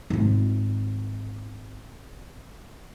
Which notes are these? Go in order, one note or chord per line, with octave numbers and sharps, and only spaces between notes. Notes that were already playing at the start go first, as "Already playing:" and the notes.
G#1 F4